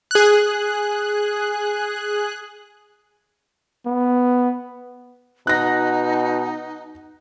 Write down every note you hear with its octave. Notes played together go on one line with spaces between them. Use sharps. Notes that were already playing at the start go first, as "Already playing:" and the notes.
G#4 F#6
B3
B2 D#4 F#5 A#5 F#6 A#6